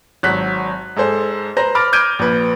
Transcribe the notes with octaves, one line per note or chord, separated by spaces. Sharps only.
G#1 F#3 F#6 B6
G#2 G#4 A4 C5
B4 C5 A#5 A#6
B5 D6 F6 A6 D7
D6 F6 G6 G#6 D7 D#7
A#1 B4